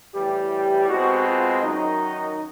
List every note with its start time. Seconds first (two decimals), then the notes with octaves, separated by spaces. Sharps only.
0.15 A2 E3 G3 G4
0.88 B2 G#3 C4 F#4
1.26 F4
1.63 F#2 D#3 F#3 D#4